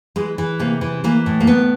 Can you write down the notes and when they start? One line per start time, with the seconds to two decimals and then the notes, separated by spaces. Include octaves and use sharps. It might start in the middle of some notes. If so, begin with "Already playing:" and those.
0.16 E3 G#3
0.38 E3
0.59 C3 A#3
0.81 E3
1.04 E3 A#3
1.26 A2
1.40 A#3
1.47 A2 B3